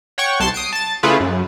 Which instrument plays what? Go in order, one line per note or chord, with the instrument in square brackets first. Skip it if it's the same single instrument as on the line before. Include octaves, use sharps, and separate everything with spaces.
[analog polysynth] C#5 F#5 G5 C#6
C2 A5 C6 A6 C7
D#6 C7 D7
A5 A6
C#3 A3 E4 F4 G#4 B4
F#2